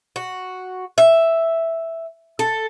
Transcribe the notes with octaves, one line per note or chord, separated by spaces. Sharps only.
F#4
E5
A4